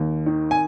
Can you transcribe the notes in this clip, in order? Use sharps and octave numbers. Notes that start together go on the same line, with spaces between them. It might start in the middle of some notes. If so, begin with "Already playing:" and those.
Already playing: D#2
D#3
G#5